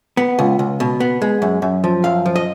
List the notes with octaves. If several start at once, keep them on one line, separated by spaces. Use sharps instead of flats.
B3
C#2
C#2
B2
B3
G#3
F#2
F#2
F3
F#2 F5
F3
D#5